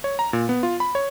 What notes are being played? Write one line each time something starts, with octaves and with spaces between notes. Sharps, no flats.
C#5
A#5
A#2
B3
F4
B5
C#5